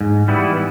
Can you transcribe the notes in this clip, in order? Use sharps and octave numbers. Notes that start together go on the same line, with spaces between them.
G#2
E3 G3 B3 E4